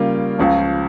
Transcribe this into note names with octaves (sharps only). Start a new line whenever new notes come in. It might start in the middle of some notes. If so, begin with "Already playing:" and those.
Already playing: C#3 G3 A#3 F4
C#2 C#3 F3